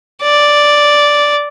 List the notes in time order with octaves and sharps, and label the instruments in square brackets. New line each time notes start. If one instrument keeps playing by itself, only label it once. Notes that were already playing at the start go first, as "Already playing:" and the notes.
[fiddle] D5